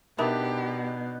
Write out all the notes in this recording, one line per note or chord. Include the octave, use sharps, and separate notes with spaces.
B2 D4 D#4 G4 A#4 B4 E5 B5